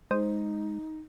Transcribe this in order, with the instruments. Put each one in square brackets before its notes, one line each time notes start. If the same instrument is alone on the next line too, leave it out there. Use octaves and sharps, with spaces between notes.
[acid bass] G#3 [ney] D#4 [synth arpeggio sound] C5 D#6